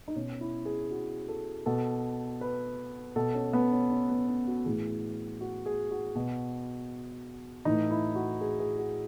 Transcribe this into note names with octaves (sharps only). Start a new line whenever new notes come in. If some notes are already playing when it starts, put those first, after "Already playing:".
D#4
B2 C#4
E4
G#4
F#4
A4
B2 A4
B4
B2 A4
C#4
B3
C#4
C#4
B3
C#4
F#4
A2 E3 G#4
F#4
G#4
F#4
B2
A2 E3 D#4
E4
F#4
G#4
G#4
F#4